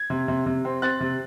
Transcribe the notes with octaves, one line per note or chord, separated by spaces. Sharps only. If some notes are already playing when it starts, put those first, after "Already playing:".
Already playing: G#6
C3
C3
C3
C4
C4 F#6 A6
C3